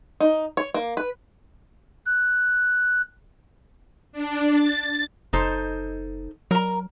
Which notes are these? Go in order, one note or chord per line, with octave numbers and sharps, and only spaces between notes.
D#4
C#5
A#3
B4
F#6
D4
A6
F#1 D#4 A4 C5
F#3 A#4 A#5